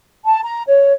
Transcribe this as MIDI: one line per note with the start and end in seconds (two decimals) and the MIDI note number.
0.25 0.39 81
0.43 0.62 82
0.68 0.93 73